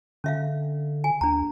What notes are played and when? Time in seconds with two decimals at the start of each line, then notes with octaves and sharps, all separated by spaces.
0.24 D3 C#4 E5 F5
1.04 G#5
1.21 D#2 D4 A#5